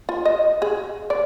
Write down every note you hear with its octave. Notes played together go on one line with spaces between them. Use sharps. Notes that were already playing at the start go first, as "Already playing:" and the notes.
F4
D#5
G#4
D5